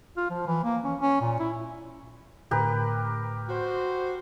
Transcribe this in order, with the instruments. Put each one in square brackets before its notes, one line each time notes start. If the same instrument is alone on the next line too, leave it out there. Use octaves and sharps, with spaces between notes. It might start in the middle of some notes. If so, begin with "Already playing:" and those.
[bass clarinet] F4
F3
E3
A#3
C#4
C#4
A#2
E4
[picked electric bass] A2 D3 [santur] G4 A#4 B4
[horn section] F#4 C5